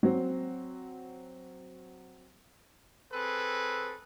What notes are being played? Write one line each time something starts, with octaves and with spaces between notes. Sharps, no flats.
F#3 C4
C4 G#4 A4 B4